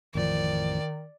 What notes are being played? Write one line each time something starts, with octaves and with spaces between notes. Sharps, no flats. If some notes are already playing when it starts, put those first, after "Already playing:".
A1 F2 D#3 F3 D5